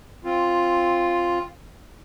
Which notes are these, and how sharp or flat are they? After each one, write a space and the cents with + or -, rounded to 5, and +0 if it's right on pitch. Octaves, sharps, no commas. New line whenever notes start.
C4 +10 F4 +0